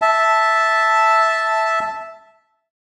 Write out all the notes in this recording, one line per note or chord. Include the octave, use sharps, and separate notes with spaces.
E5 A5